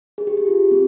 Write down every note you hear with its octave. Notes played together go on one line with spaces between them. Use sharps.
G#4
G4
G4
F4
C4